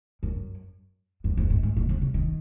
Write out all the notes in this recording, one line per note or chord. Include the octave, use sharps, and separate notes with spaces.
F#2
F#2
F2
G#2
G#2
A#2
C3
C#3
D#3